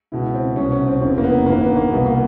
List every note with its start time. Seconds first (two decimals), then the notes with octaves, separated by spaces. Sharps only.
0.12 C#2 B2 E4
0.34 C4
0.56 C2 B2 C#4
0.72 C#4
0.87 C4
1.01 F1 E2 C#3 E3 C4
1.18 A#3
1.24 B3
1.46 G1 G2 D#3 A#3
1.61 B3
1.76 A#3
1.91 C2 B2 B3
2.06 A#3